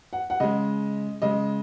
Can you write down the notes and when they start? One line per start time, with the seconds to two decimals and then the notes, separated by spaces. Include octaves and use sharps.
0.13 F#5
0.30 F#5
0.40 C#3 G#3 D#5
1.22 C#3 G#3 D#5